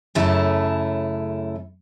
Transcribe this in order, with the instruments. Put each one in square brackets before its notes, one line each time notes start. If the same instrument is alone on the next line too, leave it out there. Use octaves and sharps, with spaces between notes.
[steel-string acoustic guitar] F#2 C#3 A3 E4 A5